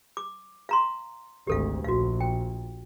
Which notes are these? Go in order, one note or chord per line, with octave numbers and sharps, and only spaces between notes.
D6
F5 A#5 C6
G#1 D2 G4 A4 F5
A#1 F#4 F5
G5